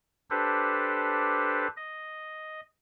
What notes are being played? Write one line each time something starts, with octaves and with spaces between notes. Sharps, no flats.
D4 G4 A4 B4 C5
D#5